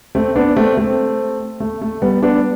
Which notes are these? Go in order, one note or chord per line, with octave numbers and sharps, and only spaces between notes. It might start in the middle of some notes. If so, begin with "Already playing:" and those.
A3 C4
B3 D4
A3 C4
A3 C4
A3
A3
G3 B3
B3 D4